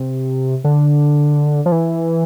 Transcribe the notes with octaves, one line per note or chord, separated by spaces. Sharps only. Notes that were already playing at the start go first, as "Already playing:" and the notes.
Already playing: C3
D3
F3
E3